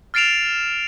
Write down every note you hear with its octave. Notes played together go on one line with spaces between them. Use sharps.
F6 A6 C7 D7 E7 F7